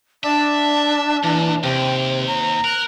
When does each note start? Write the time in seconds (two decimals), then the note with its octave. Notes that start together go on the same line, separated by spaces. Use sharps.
0.24 D4 D5 E5 A5
1.23 A#2 E3
1.63 D#2 C3 C5 G5
2.28 A#5
2.64 A#4 F#6